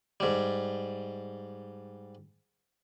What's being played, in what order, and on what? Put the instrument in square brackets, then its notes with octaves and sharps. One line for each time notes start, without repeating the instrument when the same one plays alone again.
[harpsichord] G#2 G3